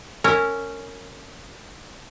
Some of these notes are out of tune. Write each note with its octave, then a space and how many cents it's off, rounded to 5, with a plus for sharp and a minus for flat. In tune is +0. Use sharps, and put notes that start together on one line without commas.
C#4 +0 A#4 -20 E5 +0